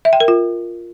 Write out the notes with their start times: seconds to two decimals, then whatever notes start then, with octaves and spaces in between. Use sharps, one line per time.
0.05 E5
0.13 G5
0.20 A#4
0.28 F4